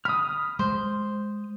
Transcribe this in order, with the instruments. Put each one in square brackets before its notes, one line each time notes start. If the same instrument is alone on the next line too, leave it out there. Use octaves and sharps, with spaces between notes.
[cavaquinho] B5 [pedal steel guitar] D#6 F6
[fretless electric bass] G#3 [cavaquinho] C5